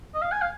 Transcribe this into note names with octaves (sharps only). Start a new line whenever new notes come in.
D#5
F5
G#5
F5